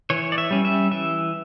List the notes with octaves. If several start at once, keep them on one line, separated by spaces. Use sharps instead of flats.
E3 C#5
D5
E5
G3 C#4
E5
E3 E5